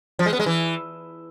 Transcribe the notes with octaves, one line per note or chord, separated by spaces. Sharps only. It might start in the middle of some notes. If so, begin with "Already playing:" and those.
F3
G#3
B3
G#3
E3